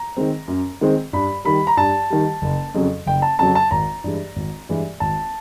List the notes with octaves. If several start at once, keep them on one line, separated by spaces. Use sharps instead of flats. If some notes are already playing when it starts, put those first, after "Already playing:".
Already playing: A#5
D#3 G#3 C4
F#2
D#3 G#3 C4
G2 B5
D#3 G3 B5
A#5
G2 A5
D#3 G3
F#1
F2 C#3 F#3
F#1 G5
A5
F2 C#3 F#3 A5
A5
G#1 A#5
G2 E3 G#3
G#1
G2 E3 G#3
G#1 A5